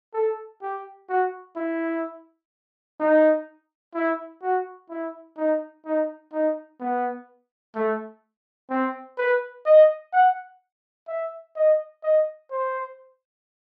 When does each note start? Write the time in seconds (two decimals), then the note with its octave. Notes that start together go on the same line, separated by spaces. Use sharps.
0.14 A4
0.61 G4
1.09 F#4
1.56 E4
3.00 D#4
3.95 E4
4.42 F#4
4.90 E4
5.37 D#4
5.85 D#4
6.32 D#4
6.80 B3
7.75 A3
8.70 C4
9.18 B4
9.66 D#5
10.13 F#5
11.08 E5
11.56 D#5
12.03 D#5
12.51 C5